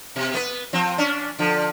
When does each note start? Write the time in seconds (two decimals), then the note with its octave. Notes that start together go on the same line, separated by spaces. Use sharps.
0.16 B2
0.34 B3 B4
0.73 F3 C4
0.98 C#4 D4
1.39 D3 F3